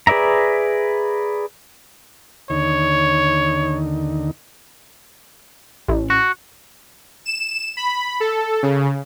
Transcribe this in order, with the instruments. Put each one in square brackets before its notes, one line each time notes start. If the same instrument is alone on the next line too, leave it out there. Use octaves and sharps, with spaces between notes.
[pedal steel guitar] G#4 B4 D5 E5 A#5
[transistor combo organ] D#2 D3 D#4 [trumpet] C#5
[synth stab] A1
[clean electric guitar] F#4
[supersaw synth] E7
B5
A4
C#3